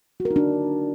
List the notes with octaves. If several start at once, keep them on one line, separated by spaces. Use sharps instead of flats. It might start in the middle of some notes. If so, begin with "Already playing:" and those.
F#4
A#4
D#4
D4